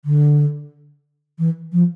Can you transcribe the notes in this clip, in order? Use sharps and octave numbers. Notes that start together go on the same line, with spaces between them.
D3
E3
F3